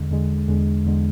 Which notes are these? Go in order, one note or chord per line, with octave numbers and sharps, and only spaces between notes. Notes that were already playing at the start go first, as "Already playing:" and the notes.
Already playing: E2 D3 G#3
E2 D3 G#3
E2 D3 G#3
E2 D3 G#3